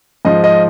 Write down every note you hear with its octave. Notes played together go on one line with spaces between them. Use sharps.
G#2 F3 D#5
D#5